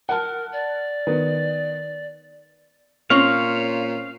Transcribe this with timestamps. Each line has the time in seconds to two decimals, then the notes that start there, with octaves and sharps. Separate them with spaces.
0.09 A#4 F#5 A5
0.52 D5
1.07 D#3 B3
3.10 A#2 C4 C#4 C#5 F5